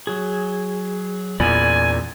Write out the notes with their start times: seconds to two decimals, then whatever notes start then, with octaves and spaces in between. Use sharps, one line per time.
0.07 F#3 G#4
1.40 E2 A#2 D5 G#5 B5